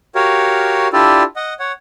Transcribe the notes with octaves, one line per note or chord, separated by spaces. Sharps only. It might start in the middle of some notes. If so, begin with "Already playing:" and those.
F#4 G4 A#4 C#5 F5
D4 E4 F4 G4 A4 D5
D#5 F#5
C#5 F#5